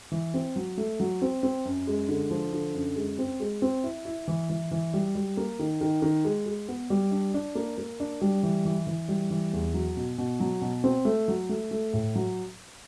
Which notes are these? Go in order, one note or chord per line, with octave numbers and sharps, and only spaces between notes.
E3
C4
F#3
A3
F#3
C4
C4
F#2
G#3
D3
F3
D3
F#2
G#3
C4
G#3
C4
E4
E4
E3
E3
E3
G3
G3
A#3
D#3
D#3
D#3
G#3
G#3
B3
G3
D4
D4
A#3
A#3
D4
G3
E3
E3
E3
G3
E3
E2
F#3
B2
B2
F#3
B2
C4
A3
F#3
A3
A3
A2
F#3